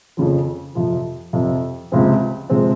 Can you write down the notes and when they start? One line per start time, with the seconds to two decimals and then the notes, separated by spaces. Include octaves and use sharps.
0.17 F2 C#3 F3
0.75 F2 C3 F3
1.33 F2 C3 F3
1.92 C#2 C3 F3 G#3 C4
2.50 C3 F3 G#3 C4